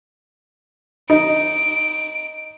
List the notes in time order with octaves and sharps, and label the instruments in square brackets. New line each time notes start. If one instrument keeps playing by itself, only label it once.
[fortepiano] D#4 [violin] D7